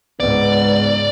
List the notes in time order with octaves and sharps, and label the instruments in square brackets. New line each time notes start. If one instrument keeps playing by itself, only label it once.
[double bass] C#2 G#2 [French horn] B3 [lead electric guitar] D5